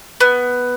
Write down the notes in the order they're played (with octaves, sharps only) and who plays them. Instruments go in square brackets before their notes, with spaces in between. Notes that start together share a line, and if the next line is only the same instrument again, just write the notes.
[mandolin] B3